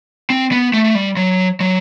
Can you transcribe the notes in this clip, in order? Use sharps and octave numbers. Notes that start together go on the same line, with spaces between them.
C4
B3
A3
A3
G3
F#3
F#3